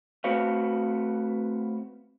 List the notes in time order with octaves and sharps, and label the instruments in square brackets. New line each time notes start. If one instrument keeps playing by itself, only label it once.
[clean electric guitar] A3 C4 F#4 B4 C#5 F5